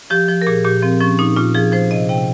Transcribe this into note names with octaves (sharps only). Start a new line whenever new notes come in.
F3 G4
F3
A#4
A#2 G#4
A#2 G4
F3 C4
F3 C#4
A#2 D#4
A#2 F4
F3 G#4
F3 C5
C3 D#5
C3 G5